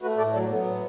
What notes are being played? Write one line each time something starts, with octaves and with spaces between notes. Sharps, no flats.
A3 F#4 B4
A2 A4 D5
F#3 A4 D5
F#3 B3
A2